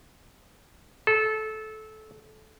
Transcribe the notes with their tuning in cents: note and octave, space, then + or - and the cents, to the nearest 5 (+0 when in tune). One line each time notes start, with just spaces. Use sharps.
A4 -20